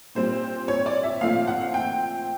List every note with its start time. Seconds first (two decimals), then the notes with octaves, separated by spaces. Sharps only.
0.15 A#2 G3 C4 C5
0.68 C#5
0.86 D5
1.03 E5
1.21 A#2 F3 A3 C4 F5
1.47 F#5
1.74 G5